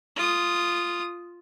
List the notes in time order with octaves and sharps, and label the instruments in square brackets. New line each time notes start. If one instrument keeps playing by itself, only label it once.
[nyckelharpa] F4 D#6